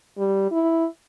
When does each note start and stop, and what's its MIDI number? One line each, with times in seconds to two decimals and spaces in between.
0.18 0.50 55
0.51 0.86 64